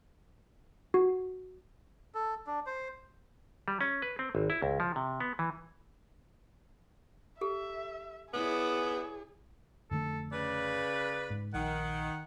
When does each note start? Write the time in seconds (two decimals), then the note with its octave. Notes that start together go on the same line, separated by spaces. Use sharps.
0.94 F#4
2.15 A4
2.47 D4
2.66 C5
3.68 G3
3.81 C#4
4.02 B4
4.19 C4
4.35 G#1
4.50 E4
4.62 C#2
4.80 F3
4.96 C3
5.20 B3
5.39 E3
7.41 G4 A4 E5
8.34 B3 E4 G#4 C#5 D5
9.91 F2 D3 A3 A4
10.32 C#3 B4 D5
11.30 G#2
11.54 A#1 D#3 F#5